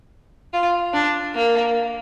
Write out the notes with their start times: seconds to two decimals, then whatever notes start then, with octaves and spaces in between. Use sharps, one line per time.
0.53 F4
0.93 D4
1.34 A#3